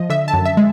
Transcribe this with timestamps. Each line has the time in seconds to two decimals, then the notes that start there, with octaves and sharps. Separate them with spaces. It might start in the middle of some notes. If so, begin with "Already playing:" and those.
Already playing: F3 D#5
0.09 D3 E5
0.28 A5
0.33 F#2
0.45 E5
0.57 G#3